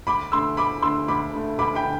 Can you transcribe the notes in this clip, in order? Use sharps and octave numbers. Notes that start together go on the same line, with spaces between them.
D2 B5 D6
D3 A3 C6 E6
D2 B5 D6
D3 A3 C6 E6
D2 B5 D6
D3 A3
D2 B5 D6
G5 B5
D3